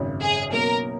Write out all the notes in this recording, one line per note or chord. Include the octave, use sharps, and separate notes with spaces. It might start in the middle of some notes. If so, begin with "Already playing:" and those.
Already playing: G#1 F#2 C#3
G#4
B2 F#3 A#3 C#4 A#4